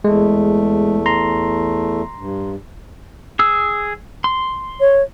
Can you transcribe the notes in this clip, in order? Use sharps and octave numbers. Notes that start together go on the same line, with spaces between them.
E2 G#3 A3
A#5 C6
G2
G#4 E6
C6
C#5